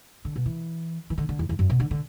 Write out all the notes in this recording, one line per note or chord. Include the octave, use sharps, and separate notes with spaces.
D3
B2
E3
E3
D3
D3
E2
E2
F#2
B2
D3
D3